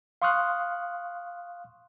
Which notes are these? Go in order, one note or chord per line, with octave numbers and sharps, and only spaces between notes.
F5 C6 C#6 D#6 F6 F#6